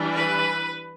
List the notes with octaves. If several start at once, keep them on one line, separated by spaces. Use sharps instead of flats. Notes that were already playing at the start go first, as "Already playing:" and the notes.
Already playing: E3 G3 D4
B4